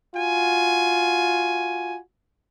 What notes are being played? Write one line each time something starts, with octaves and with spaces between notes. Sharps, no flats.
F4 F#4 G#5